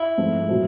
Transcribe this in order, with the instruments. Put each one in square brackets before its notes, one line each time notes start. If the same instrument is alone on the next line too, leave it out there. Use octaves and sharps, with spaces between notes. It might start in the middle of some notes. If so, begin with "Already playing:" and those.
Already playing: [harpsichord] E4
[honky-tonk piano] G#2 F3 A3 C4
A#2 F#3 A3 C4